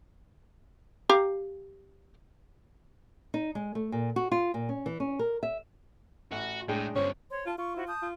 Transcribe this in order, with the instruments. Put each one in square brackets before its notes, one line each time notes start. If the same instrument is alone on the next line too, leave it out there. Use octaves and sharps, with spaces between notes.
[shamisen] G4 F5 A#5
[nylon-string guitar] D#4
G#3
A3
A#2
F#4
F4
A#2
C#4
E3
C#4
A#4
E5
[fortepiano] A1 [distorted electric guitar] F#4
[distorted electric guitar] A2 [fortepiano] G#3 D4 G5
[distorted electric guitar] G2 D3 [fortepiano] C#4 C5 [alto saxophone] C#5
[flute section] C5 C#5 C6
[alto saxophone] F4 [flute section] A5
[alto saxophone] F4 [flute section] C#6
[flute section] E4 F#4 C5
A5 D#6 G6
[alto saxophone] F4